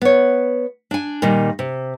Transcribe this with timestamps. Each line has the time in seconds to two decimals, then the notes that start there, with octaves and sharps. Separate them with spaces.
0.02 B3 C#5
0.91 D4 G#5
1.22 A#2 D#3 G3
1.59 C3